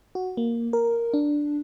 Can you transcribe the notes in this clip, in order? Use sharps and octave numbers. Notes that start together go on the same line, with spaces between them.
F#4
A#3
A#4
D4